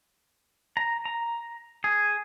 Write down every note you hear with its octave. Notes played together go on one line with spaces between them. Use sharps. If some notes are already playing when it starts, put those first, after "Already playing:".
A#5
A#5
G#4